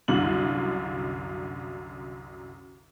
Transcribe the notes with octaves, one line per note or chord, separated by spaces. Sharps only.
C2 F#2 D3 F4 F#7